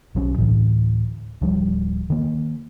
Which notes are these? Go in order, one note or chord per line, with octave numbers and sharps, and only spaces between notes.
B1 F#3 C#4
D2 A2 E3
D1 F3 G3
D#3 A#3